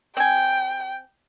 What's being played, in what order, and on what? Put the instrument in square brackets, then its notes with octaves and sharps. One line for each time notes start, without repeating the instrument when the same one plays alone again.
[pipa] C4 G#5 [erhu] G5